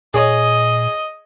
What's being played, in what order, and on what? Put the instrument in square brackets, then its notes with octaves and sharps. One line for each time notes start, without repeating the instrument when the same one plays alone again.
[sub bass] A#2 [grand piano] G#4 C#5 [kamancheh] D#5